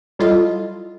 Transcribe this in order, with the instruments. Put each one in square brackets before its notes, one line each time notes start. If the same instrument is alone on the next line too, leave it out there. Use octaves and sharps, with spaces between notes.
[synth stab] F#3 G3 E4 F4 A4 D#5